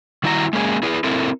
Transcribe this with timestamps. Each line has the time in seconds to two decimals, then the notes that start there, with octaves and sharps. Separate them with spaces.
0.24 D#3 G3 E4 F#4 E5 A#5
0.53 G#3 A#3 C#4 G#4
0.83 E4 G#4 B4
1.04 C4 E4 A4 A#4